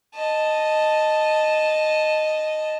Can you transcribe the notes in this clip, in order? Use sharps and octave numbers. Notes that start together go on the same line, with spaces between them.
D#5 A5